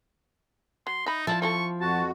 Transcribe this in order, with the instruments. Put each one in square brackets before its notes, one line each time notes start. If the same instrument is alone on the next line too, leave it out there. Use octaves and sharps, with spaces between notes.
[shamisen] F#3 [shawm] C6
[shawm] D#4 [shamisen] E5 B5
[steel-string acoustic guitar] F3 [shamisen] E4 D5 E5 [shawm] A5
[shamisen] C4 E4 A4 [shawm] C#6
[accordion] F2 F#4 [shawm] A5